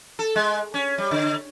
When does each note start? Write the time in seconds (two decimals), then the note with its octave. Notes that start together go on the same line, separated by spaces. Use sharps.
0.19 A4
0.36 G#3
0.74 C#4
0.98 G3
1.11 D3